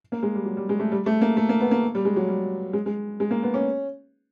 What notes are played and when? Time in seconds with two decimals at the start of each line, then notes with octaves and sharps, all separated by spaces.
0.12 A#3
0.23 G#3
0.35 G3
0.45 F#3
0.57 G3
0.69 G#3
0.80 A3
0.92 G3
1.06 A3
1.21 A#3
1.37 A3
1.49 A#3
1.60 B3
1.71 A#3
1.95 G3
2.05 G#3
2.16 F#3
2.29 G3
2.73 G#3
2.86 G#3
3.20 G#3
3.31 A#3
3.43 B3
3.54 C#4